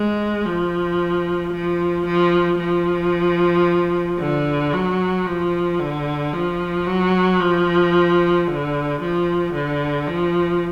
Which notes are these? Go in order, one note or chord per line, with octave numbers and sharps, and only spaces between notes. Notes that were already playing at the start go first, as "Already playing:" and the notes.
Already playing: G#3
F3
F3
F3
F3
D3
F#3
F3
D3
F3
F#3
F3
D3
F3
D3
F3